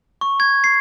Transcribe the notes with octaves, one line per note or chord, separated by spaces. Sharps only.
C#6
G#6
C7